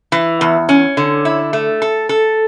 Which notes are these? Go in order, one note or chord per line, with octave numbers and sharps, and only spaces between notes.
E3
E2
C#4
D3
E4
A3
A4
A4